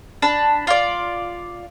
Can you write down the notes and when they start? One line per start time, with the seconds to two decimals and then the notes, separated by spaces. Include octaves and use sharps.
0.22 D4 A5 B5
0.67 F4 D5